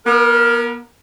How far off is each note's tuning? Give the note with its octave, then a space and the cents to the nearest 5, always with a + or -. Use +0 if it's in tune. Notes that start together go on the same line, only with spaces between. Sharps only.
B3 -40 A#4 +0